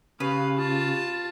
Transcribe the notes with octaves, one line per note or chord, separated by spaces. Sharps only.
C#3 G4 B4 F5
F4 A5